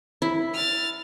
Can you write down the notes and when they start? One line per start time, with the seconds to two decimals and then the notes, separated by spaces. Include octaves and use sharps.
0.22 E4
0.53 F6 A6